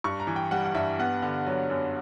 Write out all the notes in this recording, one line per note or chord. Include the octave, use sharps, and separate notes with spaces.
G2 C#6
A#5
E3
G5
G3 F#5
F#5
G2 E5
B3 F#5
D3
F#3
F#2